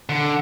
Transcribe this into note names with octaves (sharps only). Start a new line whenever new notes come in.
D3